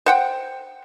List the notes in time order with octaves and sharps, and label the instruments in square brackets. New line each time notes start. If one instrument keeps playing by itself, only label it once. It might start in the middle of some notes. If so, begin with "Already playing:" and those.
[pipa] C5 F#5 G5